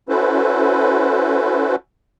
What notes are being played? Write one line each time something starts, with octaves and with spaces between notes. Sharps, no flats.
C#4 E4 F#4 A4 B4 C5